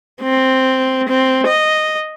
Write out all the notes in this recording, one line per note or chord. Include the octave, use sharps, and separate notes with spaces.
C4
C4
D#5